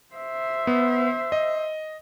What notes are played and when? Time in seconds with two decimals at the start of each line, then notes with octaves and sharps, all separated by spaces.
0.15 C5 E5
0.67 B3
1.32 D#5